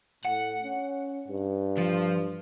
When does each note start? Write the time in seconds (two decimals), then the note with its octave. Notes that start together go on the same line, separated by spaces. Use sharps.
0.25 A2 F#5
0.63 C#4
1.28 G2
1.78 F3